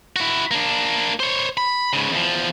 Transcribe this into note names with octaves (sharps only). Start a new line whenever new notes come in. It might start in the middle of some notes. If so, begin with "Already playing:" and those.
E4 F#4
A#3 D4
C5 C#5
B5
G#2 C#3
E2 F3